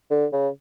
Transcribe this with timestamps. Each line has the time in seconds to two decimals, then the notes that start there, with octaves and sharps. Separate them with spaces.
0.11 D3
0.33 C#3